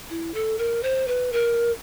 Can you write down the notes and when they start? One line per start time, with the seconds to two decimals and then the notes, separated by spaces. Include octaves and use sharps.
0.10 E4
0.34 A4
0.58 A#4
0.83 C5
1.08 B4
1.32 A#4